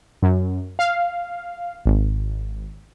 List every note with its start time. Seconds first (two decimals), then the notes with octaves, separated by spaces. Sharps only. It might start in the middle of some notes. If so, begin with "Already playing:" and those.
0.22 F#2
0.79 F5
1.86 G#1